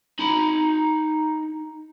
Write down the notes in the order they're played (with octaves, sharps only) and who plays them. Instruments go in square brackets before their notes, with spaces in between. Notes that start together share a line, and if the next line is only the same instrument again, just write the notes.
[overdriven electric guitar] D#4 B5